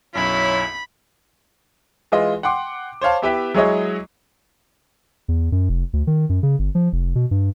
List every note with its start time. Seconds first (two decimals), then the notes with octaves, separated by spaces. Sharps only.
0.15 B1 F#2 E4 C#5 B5
2.12 E3 G#3 F4 D#5
2.43 F#5 G5 C6 D6
3.01 C5 C#5 F5 A5
3.22 B3 E4 G4 B4 E5 G5
3.54 F#3 G#3 E4 G#4 C#5 D#5
5.28 E2
5.52 F#2
5.69 F1
5.93 D2
6.07 D#3
6.29 F#2
6.43 C#3
6.59 G1
6.75 F3
6.93 F1
7.15 B2
7.31 G2